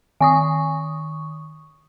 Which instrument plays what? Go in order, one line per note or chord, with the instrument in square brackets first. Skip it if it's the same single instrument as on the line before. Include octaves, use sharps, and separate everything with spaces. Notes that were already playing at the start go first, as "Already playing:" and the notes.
[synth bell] D#3 C#6 D#6 [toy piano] G#5